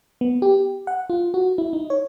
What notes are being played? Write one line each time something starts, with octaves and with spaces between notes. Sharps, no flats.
B3
G4
F#5
F4
F#4
E4
D#4
C#5